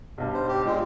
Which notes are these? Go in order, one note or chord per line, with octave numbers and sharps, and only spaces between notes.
B1 G2
C5
G4
A#2 G#3